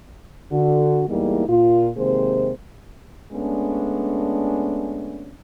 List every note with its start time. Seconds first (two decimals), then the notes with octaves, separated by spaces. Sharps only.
0.52 D3 F#4
1.09 E2 G3 G#3 A#3 D#4 E4
1.48 A#2 F4
1.96 C3 D#3 G#3 A#3 G#4 C5
3.32 G#3 A3 B3 C#4 D4